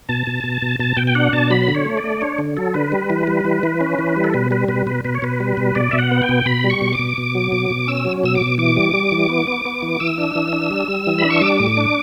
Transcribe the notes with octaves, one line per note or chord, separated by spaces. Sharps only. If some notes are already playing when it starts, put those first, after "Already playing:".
B2 A5
B2
B2
B2
B2 A5
B2 G5
G5
D4 F#5
B2 A5
F#3 B5
D3
C#5
A3
D5
A3
D4 C#5
D3
F#3 A4
D3 B4
G3
E3
G3
E3
E3
C#4
E3
G3
A4
B2 B4
G3 B4
B2 B4
B2 B4
B2 B4
C#5
B2 B4
G3
B2
B2 D5
B2 E5
F#5
B3
G5
B2
B2 B5
G3
C#6
B2
D6
B2
B2
F#3
B2
B2
C#4 E6
F#3
B2 E6
D6
B2
E3 D6
G3
G3
E3
B3
B3
B3
E3
E3 E6
D4
E3
D4
G3
G3
E3
B5
D4
C#6
G3 D6
A2
D4